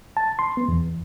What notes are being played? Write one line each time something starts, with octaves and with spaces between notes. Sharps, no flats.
A5
C6
B3
E2